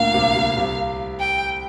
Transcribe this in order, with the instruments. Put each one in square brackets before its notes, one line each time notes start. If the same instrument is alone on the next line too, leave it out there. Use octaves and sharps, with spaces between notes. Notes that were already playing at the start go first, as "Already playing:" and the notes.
Already playing: [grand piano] D2 A#2 D3 A#3 [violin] F5
[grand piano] C2 C3
C2 C3
C2 C3
[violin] G5